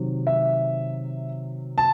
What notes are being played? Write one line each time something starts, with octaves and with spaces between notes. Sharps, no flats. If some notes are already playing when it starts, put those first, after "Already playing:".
Already playing: C3 D#3 F#3
E5
A5